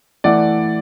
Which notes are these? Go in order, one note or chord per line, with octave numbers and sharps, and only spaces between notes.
E3 A3 E4 D5 F#5